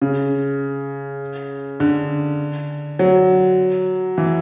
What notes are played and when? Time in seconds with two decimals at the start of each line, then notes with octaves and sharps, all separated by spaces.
0.02 C#3
1.80 D3
2.99 F#3
4.18 E3